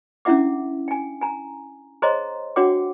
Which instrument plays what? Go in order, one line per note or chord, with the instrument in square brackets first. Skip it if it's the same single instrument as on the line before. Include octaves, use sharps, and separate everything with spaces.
[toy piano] C#4 D4 E4 E5 F#5 D6
G5 G#5
G#5 A#5
G#4 C5 C#5 D#5 A#5 C6
D4 F#4 C#5 F#5 G5 D6